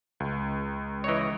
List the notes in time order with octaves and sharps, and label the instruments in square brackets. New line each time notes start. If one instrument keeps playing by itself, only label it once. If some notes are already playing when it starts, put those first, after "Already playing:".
[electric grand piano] C#2
[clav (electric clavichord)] E3 C#5 [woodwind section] D#5